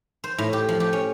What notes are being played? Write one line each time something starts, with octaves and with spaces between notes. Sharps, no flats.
C5
A2
G4
F3
G4
C#4